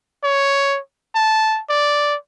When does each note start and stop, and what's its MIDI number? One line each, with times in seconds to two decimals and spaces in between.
0.24 0.79 73
1.15 1.61 81
1.69 2.16 74